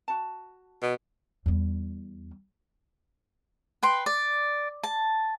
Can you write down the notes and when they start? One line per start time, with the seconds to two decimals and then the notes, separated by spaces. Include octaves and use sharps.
0.08 F#4 A5
0.82 B2
1.46 E2 G3
3.83 B4 G5 C6
4.06 D5
4.83 A5